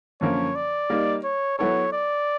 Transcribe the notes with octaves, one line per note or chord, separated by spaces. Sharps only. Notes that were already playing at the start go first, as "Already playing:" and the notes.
F#2 D3 F3 A#3 C#4 C#5
D5
G3 A#3 D#4
C#5
F#3 B3 E4 A4 C#5
D5